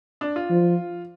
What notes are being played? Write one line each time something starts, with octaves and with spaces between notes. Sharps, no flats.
D4
F4
F3